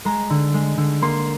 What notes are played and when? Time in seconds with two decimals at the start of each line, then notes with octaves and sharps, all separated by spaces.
0.05 G#3 A#5
0.30 D3
0.54 G#3
0.77 D3
1.02 A#3 C6